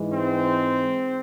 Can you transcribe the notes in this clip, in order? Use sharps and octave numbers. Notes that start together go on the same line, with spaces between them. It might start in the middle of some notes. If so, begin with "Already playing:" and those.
Already playing: G#2 E3 G#3
C4